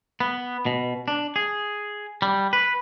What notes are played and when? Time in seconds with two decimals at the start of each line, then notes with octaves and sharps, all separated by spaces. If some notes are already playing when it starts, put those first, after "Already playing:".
0.20 B3
0.66 B2
1.08 D4
1.36 G#4
2.22 G3
2.53 B4